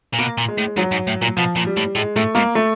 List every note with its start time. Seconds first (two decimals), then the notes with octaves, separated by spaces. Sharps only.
0.13 A#2
0.19 B2 A#3
0.38 A#2
0.48 G#3
0.58 A2
0.77 G#2 F#3
0.92 G#2
1.07 A2
1.22 A#2
1.37 B2 F3
1.56 A#2
1.67 G3
1.77 A2
1.95 A2 G#3
2.16 A2 A3
2.35 G#2 A#3
2.55 A3